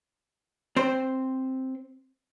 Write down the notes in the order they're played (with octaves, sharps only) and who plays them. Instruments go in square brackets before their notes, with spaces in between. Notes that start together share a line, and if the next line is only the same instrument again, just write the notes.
[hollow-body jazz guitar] C4 C5